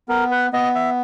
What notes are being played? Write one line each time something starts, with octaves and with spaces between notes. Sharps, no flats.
B3 A#4
B4
B3 D#5
E5